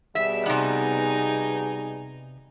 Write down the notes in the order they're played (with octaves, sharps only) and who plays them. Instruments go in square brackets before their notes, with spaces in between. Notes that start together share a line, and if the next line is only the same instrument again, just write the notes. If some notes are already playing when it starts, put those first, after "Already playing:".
[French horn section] B2 G3 G#4 [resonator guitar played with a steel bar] E5
[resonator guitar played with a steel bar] C3 B3 [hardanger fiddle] D#4 G#5